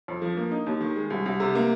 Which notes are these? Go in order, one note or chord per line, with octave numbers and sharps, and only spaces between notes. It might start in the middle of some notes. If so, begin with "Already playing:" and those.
F2
F3
A#3
D#4
D#2
D#3
G#3
C2
C2
C3
A#3